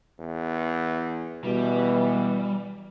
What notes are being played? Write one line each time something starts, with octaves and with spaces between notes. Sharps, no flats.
E2
B2 E3 G3